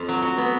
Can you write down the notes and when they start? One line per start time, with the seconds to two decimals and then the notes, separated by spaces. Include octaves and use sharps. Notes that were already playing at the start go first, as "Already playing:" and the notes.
Already playing: F2
0.09 F#3
0.23 F#4
0.38 B3